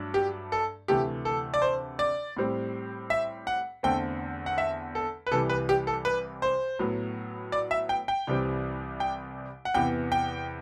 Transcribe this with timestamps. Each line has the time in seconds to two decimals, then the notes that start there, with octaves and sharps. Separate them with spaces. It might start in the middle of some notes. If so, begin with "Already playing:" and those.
Already playing: G2 F#3 A3 D4
0.14 G4
0.52 A4
0.88 D2 C3 E3 A3 G4
1.25 A4
1.54 D5
1.62 C5
1.99 D5
2.37 A2 G3 C4
3.10 E5
3.47 F#5
3.83 E2 D3 A3 C4 G5
4.46 F#5
4.58 E5
4.95 A4
5.27 B4
5.31 C2 C3 E3 G3 A4
5.50 B4
5.69 G4
5.87 A4
6.05 B4
6.42 C5
6.79 A2 F#3 B3
7.52 D5
7.71 E5
7.89 G5
8.08 G5
8.27 C2 C3 E3 G3 C4
9.00 G5
9.65 F#5
9.74 E2 C3 E3 B3 G5
10.12 G5